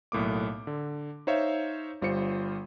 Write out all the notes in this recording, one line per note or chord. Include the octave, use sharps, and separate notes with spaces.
B1 A2 A#3 D6
D3
D#4 C5 C#5 E5 F5
G1 G3 F4 C5 C#7